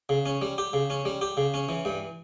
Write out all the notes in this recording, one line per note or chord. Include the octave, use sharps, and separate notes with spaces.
C#3
C#4
G3
G4
C#3
C#4
G3
G4
C#3
C#4
E3
G2